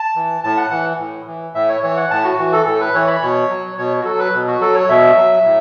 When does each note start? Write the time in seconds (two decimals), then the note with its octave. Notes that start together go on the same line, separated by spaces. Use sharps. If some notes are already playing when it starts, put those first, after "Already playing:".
Already playing: A5
0.15 E3
0.44 A2 A5
0.57 F#5
0.71 E3 F#5
0.99 A2
1.27 E3
1.54 A2 E5
1.69 C#5
1.83 E3 C#5
1.97 F#5
2.11 A2 A5
2.24 F#4
2.39 E3 F#4
2.53 A4
2.66 A2 A4
2.80 B4
2.94 E3 C#5
3.08 B5
3.22 B2 C#5
3.50 F#3
3.78 B2 C#5
4.01 F#4
4.05 F#3 A4
4.19 B4
4.34 B2
4.48 F#4
4.61 F#3 A4
4.75 C#5
4.89 B2 E5
5.17 F#3
5.45 A2